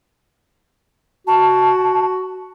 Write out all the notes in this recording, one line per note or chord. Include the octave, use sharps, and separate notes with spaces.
F#4 A5